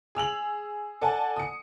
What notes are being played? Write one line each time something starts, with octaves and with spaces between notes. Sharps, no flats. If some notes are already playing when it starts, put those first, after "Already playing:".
G#4 E6 F7 F#7
A4 D5 F#5 G#5 A5
D#6 C#7